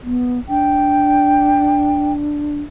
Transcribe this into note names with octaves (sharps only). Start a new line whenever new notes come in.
B3
D4 G5